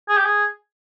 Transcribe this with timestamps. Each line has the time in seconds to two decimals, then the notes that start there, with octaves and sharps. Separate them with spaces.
0.09 G#4
0.17 G4
0.25 G#4